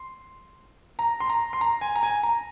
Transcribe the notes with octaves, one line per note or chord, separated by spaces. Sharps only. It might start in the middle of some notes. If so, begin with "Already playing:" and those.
Already playing: C6
A#5
C6
A#5
C6
A#5
G#5
A#5
G#5
A#5